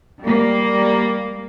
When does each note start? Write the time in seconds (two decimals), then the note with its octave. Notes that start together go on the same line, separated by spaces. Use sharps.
0.21 G3 A#3